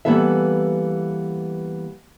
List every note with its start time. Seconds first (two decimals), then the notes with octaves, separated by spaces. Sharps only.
0.05 E3 G3 A#3 B3 A4 E5